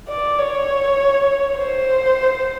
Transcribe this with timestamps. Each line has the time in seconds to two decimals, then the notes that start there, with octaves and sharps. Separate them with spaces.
0.09 D5
0.38 C#5
1.57 C5